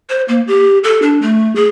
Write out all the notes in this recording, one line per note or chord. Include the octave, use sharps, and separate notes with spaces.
C5
A#3
G4
A4
D4
A3
G#4